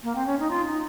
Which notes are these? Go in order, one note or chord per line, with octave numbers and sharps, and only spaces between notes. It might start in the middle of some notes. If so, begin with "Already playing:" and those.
A#3
C4
C#4
D#4
F4
D#4